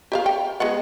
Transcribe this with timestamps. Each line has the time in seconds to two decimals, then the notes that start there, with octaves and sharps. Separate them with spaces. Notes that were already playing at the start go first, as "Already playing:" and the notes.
0.12 G4 E5 F5
0.26 G5
0.60 G#3 B3 F#5